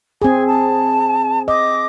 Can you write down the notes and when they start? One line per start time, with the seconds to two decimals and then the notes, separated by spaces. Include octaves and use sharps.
0.22 C4 G#4 G#5
0.47 A5
1.48 D#5 D6